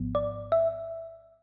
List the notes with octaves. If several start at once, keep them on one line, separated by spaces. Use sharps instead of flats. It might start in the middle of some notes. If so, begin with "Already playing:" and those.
Already playing: G#1 G#2 F3 B3
D5
E5